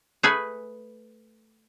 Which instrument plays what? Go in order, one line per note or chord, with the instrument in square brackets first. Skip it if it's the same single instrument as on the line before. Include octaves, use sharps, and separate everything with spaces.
[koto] A3 G#4 B4 G#5